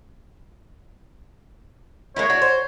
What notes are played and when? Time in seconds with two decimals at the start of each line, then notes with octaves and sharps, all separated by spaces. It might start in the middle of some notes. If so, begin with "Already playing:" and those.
2.16 G#3 A#3 E4 C#5
2.30 D4 F#4
2.42 C5